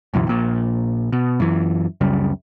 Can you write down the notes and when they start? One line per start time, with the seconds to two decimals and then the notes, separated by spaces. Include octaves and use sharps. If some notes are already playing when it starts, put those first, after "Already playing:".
0.14 C#2 F#2 B2 E3
0.27 A#1 A#2
1.13 B2
1.40 F#2 E3
2.01 C#2 F#2 C#3 G3